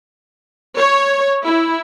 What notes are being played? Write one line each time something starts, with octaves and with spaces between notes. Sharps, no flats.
C#5
E4